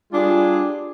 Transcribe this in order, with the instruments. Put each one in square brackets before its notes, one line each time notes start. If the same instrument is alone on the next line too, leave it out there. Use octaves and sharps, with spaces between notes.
[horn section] G3 D4 F4 G#4